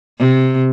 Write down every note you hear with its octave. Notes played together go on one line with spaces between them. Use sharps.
C3